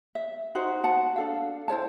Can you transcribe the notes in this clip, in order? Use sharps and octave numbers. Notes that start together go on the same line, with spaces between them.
E5
D#4 F#4 C5
F#4 F#5 A5
D4 A4 F5
E4 C5 C#5 A5